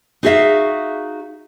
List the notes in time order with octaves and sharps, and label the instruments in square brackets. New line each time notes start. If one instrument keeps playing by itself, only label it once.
[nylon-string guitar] D#4 F#4 G#4 C5 E5 F5